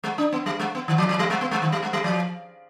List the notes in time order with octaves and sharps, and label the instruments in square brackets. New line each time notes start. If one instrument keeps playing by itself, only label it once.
[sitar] G#3
D4
B3
G3
G#3
B3
D#3
F3
F3
G3
G#3
B3
G#3
D#3
G3
G#3
G3
F3